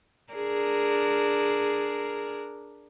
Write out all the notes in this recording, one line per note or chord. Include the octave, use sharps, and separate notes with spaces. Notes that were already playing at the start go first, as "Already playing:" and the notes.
D4 G#4 A#4